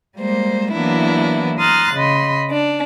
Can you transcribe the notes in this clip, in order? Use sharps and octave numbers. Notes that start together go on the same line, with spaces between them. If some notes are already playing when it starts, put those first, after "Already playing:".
G3 G#3 A#3 C5
E3 F#3 A#3 B3 D4 E4
A#5 C6 D#6 F6 F#6 A6
C#3 D#5 B5 C6
D4